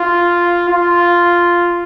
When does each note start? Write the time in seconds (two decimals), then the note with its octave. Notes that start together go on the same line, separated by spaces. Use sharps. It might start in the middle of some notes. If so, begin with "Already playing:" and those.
Already playing: F4
0.69 F4